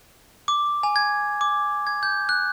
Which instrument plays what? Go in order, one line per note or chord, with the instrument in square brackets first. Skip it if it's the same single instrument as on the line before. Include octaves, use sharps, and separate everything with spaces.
[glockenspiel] D6
G#5
G#6
D6
G#6
G6
F#6